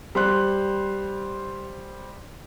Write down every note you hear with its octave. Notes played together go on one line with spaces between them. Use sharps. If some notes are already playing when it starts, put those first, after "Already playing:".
G3 C5 C6 F#6